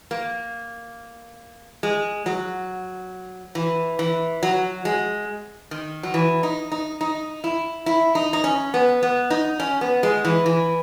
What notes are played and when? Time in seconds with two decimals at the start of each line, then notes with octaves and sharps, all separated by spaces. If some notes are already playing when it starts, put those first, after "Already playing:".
0.11 A#3
1.83 G#3
2.26 F#3
3.55 E3
3.99 E3
4.43 F#3
4.85 G#3
5.71 D#3
6.03 F#3
6.14 E3
6.43 D#4
6.72 D#4
7.01 D#4
7.44 E4
7.86 E4
8.15 D#4
8.33 D#4
8.44 C#4
8.74 B3
9.03 B3
9.30 D#4
9.60 C#4
9.81 B3
10.03 G#3
10.25 E3
10.46 E3